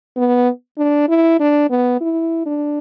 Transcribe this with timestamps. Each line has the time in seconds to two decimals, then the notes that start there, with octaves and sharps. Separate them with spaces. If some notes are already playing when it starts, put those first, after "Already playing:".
0.17 B3
0.78 D4
1.08 E4
1.40 D4
1.70 B3
2.01 E4
2.46 D4